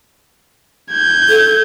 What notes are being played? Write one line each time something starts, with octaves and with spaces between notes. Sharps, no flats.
G6 G#6
A4